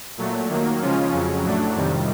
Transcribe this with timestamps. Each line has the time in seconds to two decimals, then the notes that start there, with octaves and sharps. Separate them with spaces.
0.17 A#2 F#3 A3
0.49 D#3 F#3 A#3
0.81 C#3 F3 G#3 C#4 F4
1.12 F2 C#3 F#3
1.43 A2 F#3 A3 D4
1.75 F2 C3 D#3 G3